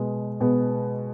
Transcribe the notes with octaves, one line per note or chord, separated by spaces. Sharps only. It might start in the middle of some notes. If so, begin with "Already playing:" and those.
Already playing: B2 G#3 B3
B2 G#3 B3